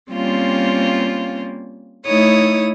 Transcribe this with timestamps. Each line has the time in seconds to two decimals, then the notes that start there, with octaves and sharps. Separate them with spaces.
0.12 G3 A#3 C4 C#4 F4
2.07 A3 D#4 E4 C#5 D#6